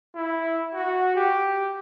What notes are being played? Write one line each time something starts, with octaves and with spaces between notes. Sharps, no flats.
E4
F#4
G4